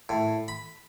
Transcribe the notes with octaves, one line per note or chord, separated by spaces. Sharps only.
A2
B5